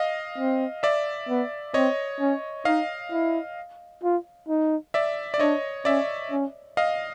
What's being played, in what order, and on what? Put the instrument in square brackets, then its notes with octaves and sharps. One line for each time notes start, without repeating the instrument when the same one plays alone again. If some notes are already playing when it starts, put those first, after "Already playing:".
Already playing: [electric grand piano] D#5 F5
[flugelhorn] C4
[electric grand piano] D5 E5
[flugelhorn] B3
[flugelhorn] C4 [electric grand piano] C#5 D#5
[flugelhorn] C#4
[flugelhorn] D#4 [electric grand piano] D#5 F5
[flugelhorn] E4
F4
D#4
[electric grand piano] D5 E5
D5
[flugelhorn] D4 [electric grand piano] C#5 D#5
[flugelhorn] C#4 [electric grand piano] D5 E5
[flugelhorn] C#4
[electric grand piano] D#5 F5